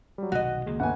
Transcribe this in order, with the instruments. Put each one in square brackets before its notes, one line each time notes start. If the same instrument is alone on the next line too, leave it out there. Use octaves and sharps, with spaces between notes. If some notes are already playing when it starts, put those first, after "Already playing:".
[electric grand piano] F#3 G3
[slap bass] F1 B1 D#3 [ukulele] F#4 D#5 [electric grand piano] F#5
[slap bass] C#2 D#3 A#3 [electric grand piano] G#4
[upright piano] G1 G#5 [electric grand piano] F#5